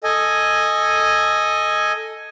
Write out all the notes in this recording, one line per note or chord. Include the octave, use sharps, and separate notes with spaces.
A4 D#5 G#5